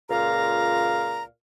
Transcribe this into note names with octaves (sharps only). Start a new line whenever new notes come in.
C#2 A#2 F5 A#5